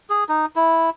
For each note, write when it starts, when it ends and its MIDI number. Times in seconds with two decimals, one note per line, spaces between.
0.10 0.24 68
0.29 0.46 63
0.56 0.90 64